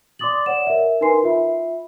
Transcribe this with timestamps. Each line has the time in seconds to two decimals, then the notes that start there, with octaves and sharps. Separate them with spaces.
0.19 D5 C6 D6 D#6 A6 F#7
0.46 C#5 D5 F#5 E7
0.67 A#4 E5
1.01 D#4 A#4 B4 G#5 C6 C7
1.23 F4 E5 B5